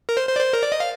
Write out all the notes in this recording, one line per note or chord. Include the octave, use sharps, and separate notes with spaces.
A#4
C5
C5
D5
C5
A#4
D5
D#5
F5